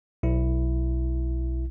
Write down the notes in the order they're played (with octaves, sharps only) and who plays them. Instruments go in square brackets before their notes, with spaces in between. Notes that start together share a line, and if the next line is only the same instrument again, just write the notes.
[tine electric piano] B1 E4